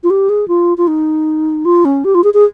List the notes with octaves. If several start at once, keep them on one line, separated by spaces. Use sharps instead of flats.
F4
G4
G#4
F4
F4
D#4
F4
C#4
G4
F4
G#4
G#4